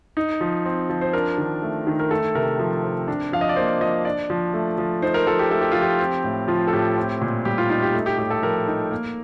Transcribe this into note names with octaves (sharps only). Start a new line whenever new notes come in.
D#4
F3
C4
F3
C5
D4 A#4
D#3
A3
D#3
A#4
A3 A4
C3 A#4
F3
C4
D4
F3 F5
D#5
D5
A#3 C5
F3 D#5
D4 D5
F3
A3
F3
D#4 C5
A#4
F3 A4
G4
A3 A4
G4
F3 F4
G4
C4
A2
F3 F4
A4
A2 G4
C4
A#2
G3 G4
F4
D#4 F4
G4
A3
G4
A2 G4
A4
F3 A#4
D#4
A#3